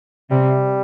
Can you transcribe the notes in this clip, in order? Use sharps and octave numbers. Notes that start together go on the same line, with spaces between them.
C3 G3